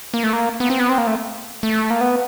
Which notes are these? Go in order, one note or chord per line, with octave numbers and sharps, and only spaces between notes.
A#3
A3
A#3
B3
C4
B3
C4
A#3
A3
A3
A#3
B3